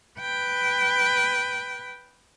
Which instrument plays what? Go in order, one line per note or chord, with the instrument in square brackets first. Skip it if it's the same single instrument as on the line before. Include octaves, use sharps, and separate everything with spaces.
[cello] B4 G5